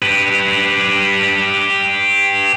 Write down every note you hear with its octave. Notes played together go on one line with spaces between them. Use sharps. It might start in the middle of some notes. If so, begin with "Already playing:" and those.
G4 B4